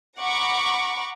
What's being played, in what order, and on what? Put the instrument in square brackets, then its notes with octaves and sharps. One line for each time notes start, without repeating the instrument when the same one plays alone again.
[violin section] F#5 A#5 B5 C#6 D6